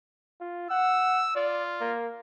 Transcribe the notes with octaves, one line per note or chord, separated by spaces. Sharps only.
F4
F#5 E6
F4 D5
A#3